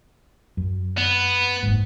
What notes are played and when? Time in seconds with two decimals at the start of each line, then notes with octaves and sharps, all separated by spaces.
0.57 F#2
0.97 B3
1.63 F#1 G#2